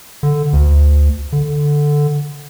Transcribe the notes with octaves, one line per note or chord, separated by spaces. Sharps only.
D3
D2
D3